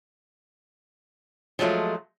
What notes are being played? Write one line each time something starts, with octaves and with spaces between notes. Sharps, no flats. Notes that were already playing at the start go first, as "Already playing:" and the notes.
F3 F#3 G#3 A3 F4